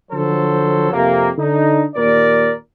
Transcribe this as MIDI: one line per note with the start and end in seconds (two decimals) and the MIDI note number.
0.11 0.89 50
0.11 0.89 53
0.11 0.89 54
0.11 0.89 69
0.11 0.89 72
0.92 1.31 41
0.92 1.31 48
0.92 1.31 58
1.38 1.85 50
1.38 1.85 62
1.38 1.85 63
1.96 2.54 39
1.96 2.54 46
1.96 2.54 70
1.96 2.54 74